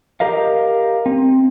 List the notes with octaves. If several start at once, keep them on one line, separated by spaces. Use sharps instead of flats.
G4 A#4 D#5 F5
C4